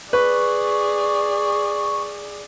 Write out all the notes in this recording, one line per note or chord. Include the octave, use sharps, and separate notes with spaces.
G#4 B4 D5 C#6